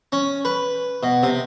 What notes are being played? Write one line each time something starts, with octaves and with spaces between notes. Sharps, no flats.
C#4
B4
B2
C3